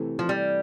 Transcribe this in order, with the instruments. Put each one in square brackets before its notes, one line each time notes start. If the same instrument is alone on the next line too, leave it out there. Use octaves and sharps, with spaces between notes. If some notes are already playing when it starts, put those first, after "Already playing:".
Already playing: [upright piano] C3 E3 A3
[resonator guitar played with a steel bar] F3
G3